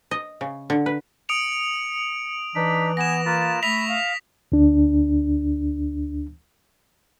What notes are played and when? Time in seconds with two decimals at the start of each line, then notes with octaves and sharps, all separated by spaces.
0.11 D#5
0.41 C#3
0.70 D3
0.86 B4
1.29 D#6 C#7 D7 F7
2.55 E3 D4 D#4 B6
2.97 B3 G#5 A#6 E7
3.26 A#3 F4 B4 A6
3.63 A3 E5 B5 D#6 A#6 B6 F7
3.88 F5
4.52 D2 D4